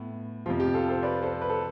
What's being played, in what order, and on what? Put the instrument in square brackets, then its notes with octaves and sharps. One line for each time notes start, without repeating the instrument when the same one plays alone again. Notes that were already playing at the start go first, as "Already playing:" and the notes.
Already playing: [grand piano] A2 B3
F2 C3 F3 F4
G4
F4 A4
A4 C5
B4 D5
A4 C5
B4
A4